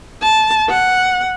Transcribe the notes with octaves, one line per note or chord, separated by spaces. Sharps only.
A5
F#5